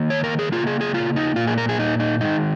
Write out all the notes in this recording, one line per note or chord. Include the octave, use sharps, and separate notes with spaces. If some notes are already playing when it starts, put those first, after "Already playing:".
Already playing: D#3 A#3
C#5
A#4
G#4
C#3 A#3 F4
G#4
G#4
F4
D#4
A#2 A#3 F4
G#4
A#4
G#4
D#4
D#4
D#3 G#3 D#4